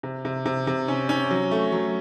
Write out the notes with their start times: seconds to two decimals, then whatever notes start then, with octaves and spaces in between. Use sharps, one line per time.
0.03 C3
0.25 C3
0.46 C3
0.67 C3
0.88 C#4
1.09 C#4
1.31 F#3
1.51 A3
1.72 F#3